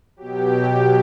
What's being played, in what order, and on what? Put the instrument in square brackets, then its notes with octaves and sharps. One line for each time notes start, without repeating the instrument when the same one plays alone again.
[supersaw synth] B2 F#3 G4